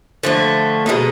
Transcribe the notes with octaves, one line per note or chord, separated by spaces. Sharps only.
D3 F3 A3
B2 G#3 B3 D#4